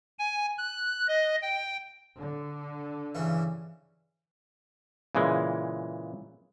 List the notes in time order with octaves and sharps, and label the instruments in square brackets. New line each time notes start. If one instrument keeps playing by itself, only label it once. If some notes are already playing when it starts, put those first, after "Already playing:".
[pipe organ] G#5
F#6
D#5
G5
[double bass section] D3
[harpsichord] G2 C#3 E3
[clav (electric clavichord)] A#2 C#3 E3 G#3